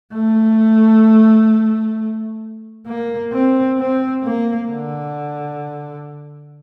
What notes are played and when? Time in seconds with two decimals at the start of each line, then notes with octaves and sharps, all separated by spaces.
0.14 A3
2.87 A#3
3.33 C4
3.78 C4
4.24 A#3
4.69 D3